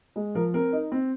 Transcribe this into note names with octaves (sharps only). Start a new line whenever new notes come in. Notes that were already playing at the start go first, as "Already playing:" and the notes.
G#3
F3 A#4
C4 A#4
D#4
C4